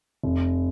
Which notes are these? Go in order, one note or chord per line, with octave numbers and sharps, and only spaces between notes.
F1